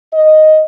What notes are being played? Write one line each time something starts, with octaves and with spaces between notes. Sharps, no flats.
D#5